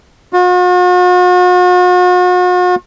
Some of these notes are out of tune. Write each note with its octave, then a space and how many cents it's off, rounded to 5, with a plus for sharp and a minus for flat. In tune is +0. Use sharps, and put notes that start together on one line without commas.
F#4 -45